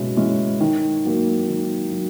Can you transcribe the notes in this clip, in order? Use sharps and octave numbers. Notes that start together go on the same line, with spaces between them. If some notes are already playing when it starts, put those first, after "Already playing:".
Already playing: B2 G#3 C#4 E4
G#3 C#4 E4
D#3
F#3 A#3
D#3
F#3